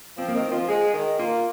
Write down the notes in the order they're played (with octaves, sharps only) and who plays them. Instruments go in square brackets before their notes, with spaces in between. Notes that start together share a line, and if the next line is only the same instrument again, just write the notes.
[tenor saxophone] F3 [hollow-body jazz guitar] C4
[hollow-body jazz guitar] A#3
[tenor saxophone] D#3 [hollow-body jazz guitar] C4
[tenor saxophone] F3 [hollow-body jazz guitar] F4
[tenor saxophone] G#3 [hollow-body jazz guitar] G#4
[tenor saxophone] D#3
[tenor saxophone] A#3 [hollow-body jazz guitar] F4